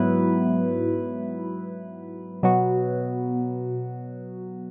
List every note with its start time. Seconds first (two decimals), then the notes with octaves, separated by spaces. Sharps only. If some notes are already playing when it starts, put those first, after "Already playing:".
Already playing: G#2 F#3 B3 E4 B4
2.43 B2 F#3 B3 F#4